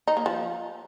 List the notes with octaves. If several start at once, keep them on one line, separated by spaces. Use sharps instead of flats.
D#4
A#3
F3